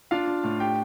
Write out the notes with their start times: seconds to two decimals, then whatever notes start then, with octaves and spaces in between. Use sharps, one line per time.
0.11 D4 F4 F5
0.27 D4
0.44 A2
0.60 G4 G5